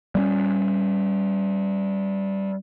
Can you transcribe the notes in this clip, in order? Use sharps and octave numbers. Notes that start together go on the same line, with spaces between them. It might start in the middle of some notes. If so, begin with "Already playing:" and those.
G3 G#3 C#4